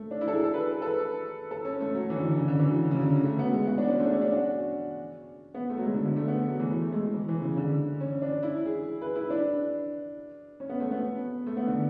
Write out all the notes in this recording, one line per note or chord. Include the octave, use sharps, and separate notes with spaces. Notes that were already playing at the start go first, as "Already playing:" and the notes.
Already playing: A3
D4
E4
A4
G#4
A4
B4
A4
B4
A4
C#4
A3
F#3
E3
D3
D3
C#3
D3
E3
F#3
C#3
D3
F#3
A3
B3
G#3
F#4
D4
C#4
A3
D4
C#4
D4
F#4
B3
A3
F#3
G#3
D3
D3
A3
B3
A3
F#3
E3
A3
A3
G#3
E3
E3
C#3
D3
C#4
D4
E4
G#4
B4
E4
D4
C#4
B3
A3
B3
A3
B3
D3